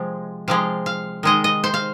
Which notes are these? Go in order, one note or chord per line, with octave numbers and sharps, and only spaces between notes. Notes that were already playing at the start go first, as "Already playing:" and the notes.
Already playing: C3 F3 G#3
C3 F3 G#3 F5
F5
D#3 G#3 D#5
D#5
C5
F5